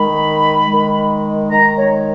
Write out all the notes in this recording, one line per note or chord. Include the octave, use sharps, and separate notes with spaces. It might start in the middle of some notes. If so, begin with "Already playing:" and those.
Already playing: D#3 G#3 B5
D#3 G#3
D#3 G#3 A#5
C#5